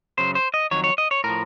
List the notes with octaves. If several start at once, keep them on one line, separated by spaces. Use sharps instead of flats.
F#2 C#3 F#3 C5
C5
D#5
F2 D#3 F#3 C#5
C#5
D#5
C#5
A2 F3 A#4